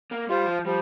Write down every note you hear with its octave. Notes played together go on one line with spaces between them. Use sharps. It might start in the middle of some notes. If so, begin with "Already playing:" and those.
A#3
G3 F4 C5
F3
F3 G3